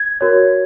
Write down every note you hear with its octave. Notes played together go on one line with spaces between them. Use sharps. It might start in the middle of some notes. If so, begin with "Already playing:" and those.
Already playing: G#6
F#4 A#4 C#5